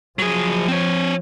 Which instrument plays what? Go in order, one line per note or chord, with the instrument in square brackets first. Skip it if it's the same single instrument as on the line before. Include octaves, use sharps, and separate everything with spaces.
[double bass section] F3 [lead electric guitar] F#3 G#4
[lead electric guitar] C4 C#5